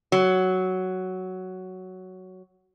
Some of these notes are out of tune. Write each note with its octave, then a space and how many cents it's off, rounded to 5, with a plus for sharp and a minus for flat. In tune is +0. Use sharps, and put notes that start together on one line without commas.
F#3 +5